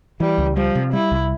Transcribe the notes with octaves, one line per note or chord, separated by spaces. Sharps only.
E3 G3
C#2
F3 G3
C3
G3 E4
C2